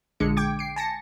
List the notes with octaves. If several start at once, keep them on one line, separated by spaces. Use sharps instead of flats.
A#1 D3 G#3 C#7
G5 D6 G#6
C7 D7
G#5 A5 A#6 C#7